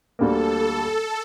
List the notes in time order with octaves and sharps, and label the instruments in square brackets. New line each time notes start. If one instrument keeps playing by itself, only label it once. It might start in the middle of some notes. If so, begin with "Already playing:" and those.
[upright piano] D2 D3 G3 A#3 [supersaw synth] A4